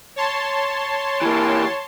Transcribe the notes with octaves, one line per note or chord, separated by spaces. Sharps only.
C#5 A5 C6
E3 A#3